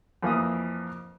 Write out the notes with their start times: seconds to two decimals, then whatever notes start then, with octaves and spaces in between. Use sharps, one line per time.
0.23 F2 E3 A#3 D#6